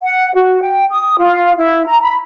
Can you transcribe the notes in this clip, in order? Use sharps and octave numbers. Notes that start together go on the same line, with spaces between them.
F#5
F#4
G5
D#6
F4
E4
A#5
B5